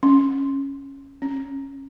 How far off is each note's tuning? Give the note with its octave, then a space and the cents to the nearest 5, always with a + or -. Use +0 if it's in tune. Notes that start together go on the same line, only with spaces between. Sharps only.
C#4 -10
C#4 -20